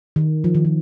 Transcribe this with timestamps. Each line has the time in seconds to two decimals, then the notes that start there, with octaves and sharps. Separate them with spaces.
0.16 D#3
0.44 F3
0.55 D#3
0.65 F3